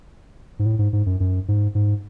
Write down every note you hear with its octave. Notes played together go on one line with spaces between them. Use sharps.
G#2
A2
G#2
G#2
F#2
F#2
G#2
G#2